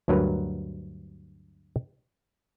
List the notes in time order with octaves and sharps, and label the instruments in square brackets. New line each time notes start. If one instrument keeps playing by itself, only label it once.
[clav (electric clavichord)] D2 G2 F#3 A#4 B4 A#5